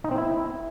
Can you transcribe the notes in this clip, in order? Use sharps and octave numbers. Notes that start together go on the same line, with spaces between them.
D#4
C4
E4